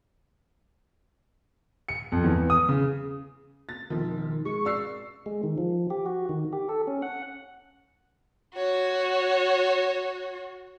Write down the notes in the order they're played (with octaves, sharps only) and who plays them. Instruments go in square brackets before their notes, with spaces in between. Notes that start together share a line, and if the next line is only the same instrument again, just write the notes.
[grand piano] C#7
F2
E2
D#6
C#3
[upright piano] A6
[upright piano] E1 F3 [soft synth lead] D#3
[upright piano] G#3 [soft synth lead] C#6
[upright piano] D5 E6 C7
[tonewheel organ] G#3
D#3
F3
G4
F#4
D#3
G4
A4
C#4
F#5
[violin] F#4 C#5